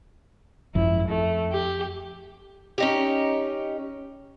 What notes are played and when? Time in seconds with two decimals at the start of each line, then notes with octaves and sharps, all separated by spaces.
0.75 G#1 F#2 F3 E4
1.08 F2 A3
1.52 G4
2.78 C#4 D#4 G4